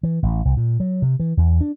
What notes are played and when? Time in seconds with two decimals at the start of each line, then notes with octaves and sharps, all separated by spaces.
0.03 E3
0.23 A1
0.45 C2
0.57 A#2
0.80 F#3
1.02 C3
1.20 E3
1.37 E2
1.61 D4